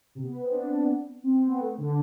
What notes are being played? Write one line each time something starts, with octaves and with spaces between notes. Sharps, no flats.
C3
B3
C4
D4
C4
C4
B3
A3
D3